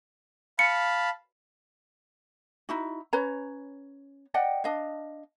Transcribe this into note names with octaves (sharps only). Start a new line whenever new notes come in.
F5 A5 B5 C#7
D#4 E4 F#4
C#4 B4 C#5 A#5
D5 D#5 F#5 G5
D4 D#5 F5